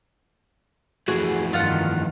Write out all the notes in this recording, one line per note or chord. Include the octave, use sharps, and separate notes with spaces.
F2 E3 A3 F#4 G#4
G2 D#3 F4 F#5